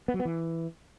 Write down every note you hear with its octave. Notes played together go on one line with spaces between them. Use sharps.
B3
F#3
B3
E3